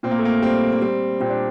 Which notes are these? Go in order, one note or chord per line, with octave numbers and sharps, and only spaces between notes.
A#2 C4
A#3
A3
A#3
G3 C4
A#3
G3 C4
A#2 C4
D4